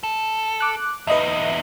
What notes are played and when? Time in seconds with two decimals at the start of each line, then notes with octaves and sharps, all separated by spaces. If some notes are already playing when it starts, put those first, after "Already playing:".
0.03 A4
0.61 D6 F#6
1.07 E2 D#4 B4 D#5 E5